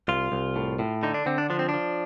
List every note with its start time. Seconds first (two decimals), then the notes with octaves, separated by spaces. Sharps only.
0.08 C2 F4
0.32 C2
0.56 A2
0.79 A2
1.03 D3 D#4
1.14 D4
1.26 D3 C4
1.38 D4
1.50 F3 D4
1.59 C4
1.69 F3 D4